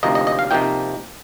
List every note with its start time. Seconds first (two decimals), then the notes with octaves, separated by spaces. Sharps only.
0.03 D2 C3 F3 A#3 D#4 D#5
0.15 D#5
0.27 D#5
0.39 F5
0.51 C3 F3 A#3 D#4 G5